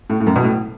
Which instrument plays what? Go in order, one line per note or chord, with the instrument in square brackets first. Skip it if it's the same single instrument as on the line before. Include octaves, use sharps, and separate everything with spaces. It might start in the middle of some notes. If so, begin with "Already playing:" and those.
[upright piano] A2
A2
F#2
B2
A2